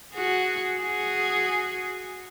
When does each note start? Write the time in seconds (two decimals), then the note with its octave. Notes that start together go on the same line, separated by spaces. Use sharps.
0.15 F#4 G#4
0.83 F#4 G#4